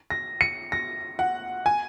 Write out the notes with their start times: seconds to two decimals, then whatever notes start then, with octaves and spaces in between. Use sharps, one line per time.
0.10 A#6
0.41 C#7
0.72 A#6
1.19 F#5
1.66 G#5